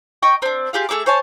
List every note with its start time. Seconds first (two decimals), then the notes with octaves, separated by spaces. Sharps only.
0.22 D#5 G5 C#6 D#6
0.42 C4 D4
0.73 F4 G4 G#4 F5
0.89 A3 G#4 E5 D6
1.06 C5 C#5 G#5 A5